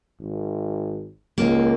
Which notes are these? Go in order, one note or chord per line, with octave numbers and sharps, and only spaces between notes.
G#1
C#2 A#3